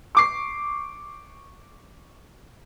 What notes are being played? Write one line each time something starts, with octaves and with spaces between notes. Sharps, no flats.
C#6 D6 C7